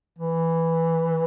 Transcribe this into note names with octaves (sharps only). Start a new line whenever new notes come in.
E3